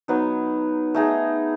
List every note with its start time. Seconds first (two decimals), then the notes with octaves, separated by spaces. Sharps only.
0.08 F#3 B3 D#4
0.94 A3 D#4 G#4